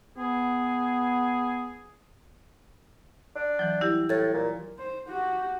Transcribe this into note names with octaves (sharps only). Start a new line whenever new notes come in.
B3 G#4
D4
E3 F#3
G3 E4 G4
A2 G#6 A6
A#2
C5
F#4 G4